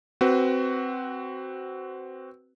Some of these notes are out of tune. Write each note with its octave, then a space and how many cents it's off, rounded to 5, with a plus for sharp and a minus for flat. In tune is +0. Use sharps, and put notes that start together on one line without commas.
C4 +0 F#4 +20 B4 +0